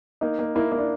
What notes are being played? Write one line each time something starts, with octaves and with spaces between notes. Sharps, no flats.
A#3 D#4
A#3
A#3 E4
A#3
D4